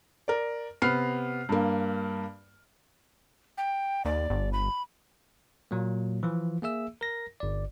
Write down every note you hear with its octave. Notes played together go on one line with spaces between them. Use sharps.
A#4 D5
C3 B3 F6 C7
G2 A#3
G5
D#2 D5
G1
B5
A#2 F#3 A#3
E3 F3 F4
A#3 G#4 E5 E6
A#4 A#6
G1 D5